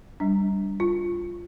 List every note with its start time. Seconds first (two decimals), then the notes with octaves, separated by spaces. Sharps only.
0.20 G3 D4
0.80 F4